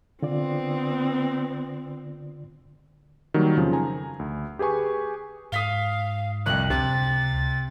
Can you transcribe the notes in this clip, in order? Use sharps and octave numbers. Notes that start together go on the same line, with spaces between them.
D3 B3 C4 F4 D5
D#3 F#3 G3 A#3
F2 C#3 F3
G#5 A#5
D2
G4 G#4 B4 G#5 C#6
G#2 F5 D#6 B6 G7
C2 F2 F#6
C#2 C3 A6